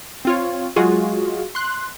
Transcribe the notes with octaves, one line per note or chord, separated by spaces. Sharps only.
C4 F4 C#5
F#3 G#3 F4 F#4 G#4
C6 F#6